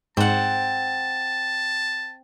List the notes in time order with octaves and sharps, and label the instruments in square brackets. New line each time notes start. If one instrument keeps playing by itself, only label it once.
[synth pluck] G#2 [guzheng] C4 F#5 [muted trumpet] A5